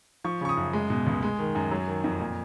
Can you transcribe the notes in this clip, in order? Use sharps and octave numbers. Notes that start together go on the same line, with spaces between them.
F3 C#6
C#3 C#6
D#6
F#2
G#3
B2
C#2
G#3
D#3
F#2
F#3
D#3
F2
A#2